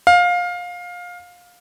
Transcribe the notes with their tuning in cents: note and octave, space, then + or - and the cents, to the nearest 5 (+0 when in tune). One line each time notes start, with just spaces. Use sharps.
F5 +20